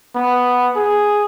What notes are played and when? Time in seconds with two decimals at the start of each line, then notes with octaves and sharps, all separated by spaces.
0.15 B3
0.77 G#4